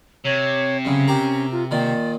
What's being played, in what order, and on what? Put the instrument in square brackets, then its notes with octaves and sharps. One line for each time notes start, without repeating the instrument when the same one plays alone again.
[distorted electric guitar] C3 [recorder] C#5
[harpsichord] F#2 C#3 [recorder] C#4
[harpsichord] G4 A#4
[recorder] F4
[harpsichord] A#2 D#3 [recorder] D5